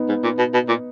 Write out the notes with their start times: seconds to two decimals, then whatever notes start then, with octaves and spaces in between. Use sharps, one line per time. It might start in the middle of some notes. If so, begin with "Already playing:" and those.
Already playing: B3 D#4
0.09 G#2
0.23 A#2
0.38 B2
0.54 B2
0.68 A#2